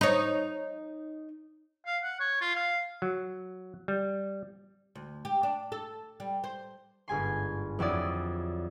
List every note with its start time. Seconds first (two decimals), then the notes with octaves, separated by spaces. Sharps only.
0.01 D#4 C#5
1.86 F5
2.03 F#5
2.20 C#5
2.41 F4
2.55 F5
3.02 F#3
3.88 G3
4.95 D2
5.25 G4
5.43 D4
5.72 A4
6.20 G3
6.44 C5
7.08 G1 G#2 G#5 C6
7.79 F2 F#3 E4 D5 D#6